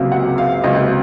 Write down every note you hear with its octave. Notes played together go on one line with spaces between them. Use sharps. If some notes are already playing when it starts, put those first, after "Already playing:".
Already playing: C#2 C3 F#3 A#3
F#5
F5
C#2 C3 F#3 A#3 D#5